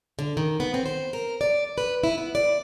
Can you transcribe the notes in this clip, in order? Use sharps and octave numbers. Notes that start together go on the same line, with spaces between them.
D3
D#3
B3
C4
C5
A#4
D5
B4
E4
B3
D5